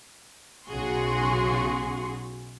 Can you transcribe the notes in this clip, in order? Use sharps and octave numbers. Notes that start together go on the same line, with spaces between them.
B1 C#3 F#4 G#4 C6 C#6